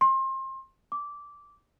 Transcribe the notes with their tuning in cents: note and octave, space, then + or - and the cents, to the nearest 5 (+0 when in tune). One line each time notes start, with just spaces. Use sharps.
C6 +30
D6 -15